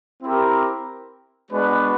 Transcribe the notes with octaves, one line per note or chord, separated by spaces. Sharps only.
C4 E4 G4 A#4
G#3 B3 D4 F#4 B4